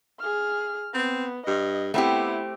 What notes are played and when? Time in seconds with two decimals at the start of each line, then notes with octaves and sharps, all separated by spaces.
0.20 G#4 F6
0.94 B3 C4
1.47 G2 D#5
1.94 A3 B3 C4 E4 G4